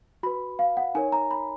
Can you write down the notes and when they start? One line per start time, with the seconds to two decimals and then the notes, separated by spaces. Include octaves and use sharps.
0.23 F#4 B4 B5
0.59 F5
0.77 F#5
0.95 D#4 A#4 C#5 G#5
1.12 A#5
1.31 B5